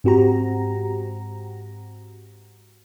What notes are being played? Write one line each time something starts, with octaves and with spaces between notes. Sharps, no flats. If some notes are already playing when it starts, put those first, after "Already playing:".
G#2 C4 F#4 G4 A#5